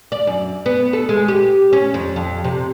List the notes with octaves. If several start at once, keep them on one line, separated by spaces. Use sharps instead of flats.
D5
F#2
B3
A4
G#3
G4
C#4
F2
F2
C3